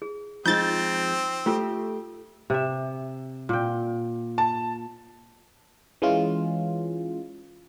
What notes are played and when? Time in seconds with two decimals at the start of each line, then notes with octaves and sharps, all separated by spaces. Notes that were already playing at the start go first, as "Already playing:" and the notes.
0.02 G#4
0.46 F2 G#3 C4 D#4 F4 G6 A6
1.46 A3 F4 G4 A4
2.50 C3 E5
3.49 A#2 G5
4.38 A5
6.02 E3 G#3 C#4 F4